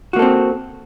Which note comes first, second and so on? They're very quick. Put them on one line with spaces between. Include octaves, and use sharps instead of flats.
F#4 A#3 A4 C4